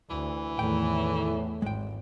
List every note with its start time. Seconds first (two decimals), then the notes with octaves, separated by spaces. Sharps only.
0.10 D2 E3
0.59 E2 A2 D#3 G5
1.62 G#1 G#3 G5